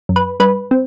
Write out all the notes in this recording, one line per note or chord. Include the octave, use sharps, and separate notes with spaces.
F#2
B4
G2 B4
C4